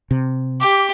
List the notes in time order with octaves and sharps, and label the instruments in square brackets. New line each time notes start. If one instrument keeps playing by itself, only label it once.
[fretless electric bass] C3
[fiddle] G4 [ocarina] D6